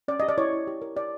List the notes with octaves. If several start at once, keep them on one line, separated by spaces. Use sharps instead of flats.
C#4 D5
G4 D#5
D5
E4 C#5
E4
G4
A#4
G4 D5